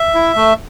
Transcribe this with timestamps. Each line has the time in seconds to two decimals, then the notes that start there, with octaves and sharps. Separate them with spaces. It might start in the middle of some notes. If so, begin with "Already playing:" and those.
Already playing: E5
0.15 E4
0.36 A3